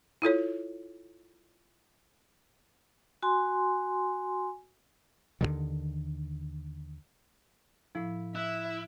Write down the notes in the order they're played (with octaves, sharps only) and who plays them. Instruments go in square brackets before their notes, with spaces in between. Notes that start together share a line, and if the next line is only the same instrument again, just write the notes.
[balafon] E4 F4 A4 C#5
[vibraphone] F#4 G#5 C6
[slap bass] D#2 B2 D3 D#3
[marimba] A2 F3 [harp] E4
[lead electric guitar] E4 [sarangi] E5 [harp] F#6